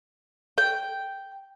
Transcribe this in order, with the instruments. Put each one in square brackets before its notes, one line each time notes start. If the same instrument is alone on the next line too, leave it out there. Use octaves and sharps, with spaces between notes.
[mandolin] G5